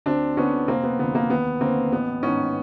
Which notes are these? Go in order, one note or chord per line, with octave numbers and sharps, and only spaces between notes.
D2 C4 D4
D3 B3 C#4
F1 A#3 C4
B3
F2 D3 B3
A#3
D#2 B3
D3 A#3 C4
A1 B3
G#2 D#3 B3 C#4